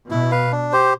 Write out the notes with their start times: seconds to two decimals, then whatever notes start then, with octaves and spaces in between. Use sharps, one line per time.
0.10 B2 E4
0.31 B4 F5
0.52 D4
0.73 G4 C5